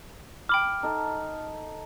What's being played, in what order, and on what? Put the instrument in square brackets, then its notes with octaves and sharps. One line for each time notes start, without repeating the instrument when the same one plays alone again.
[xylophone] G5 B5 D6 [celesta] F6
[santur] D#4 A4